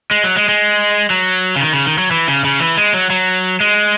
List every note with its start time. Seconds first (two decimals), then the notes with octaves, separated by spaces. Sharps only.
0.11 G#3
0.24 F#3
0.36 G#3
0.49 G#3
1.10 F#3
1.56 C#3
1.60 D#3
1.73 C#3
1.86 D#3
1.98 F#3
2.11 E3
2.28 C#3
2.44 C#3
2.60 E3
2.77 G#3
2.94 F#3
3.10 F#3
3.61 G#3